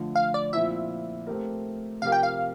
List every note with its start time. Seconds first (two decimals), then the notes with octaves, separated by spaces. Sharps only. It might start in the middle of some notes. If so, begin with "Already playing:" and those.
Already playing: D3 F3 A3
0.16 F5
0.34 D5
0.53 A#2 F3 C4 E4 E5
1.27 A3 C4 G4 A#4
2.02 C3 F3 C4 G4 A#4 F5
2.12 G5
2.23 F5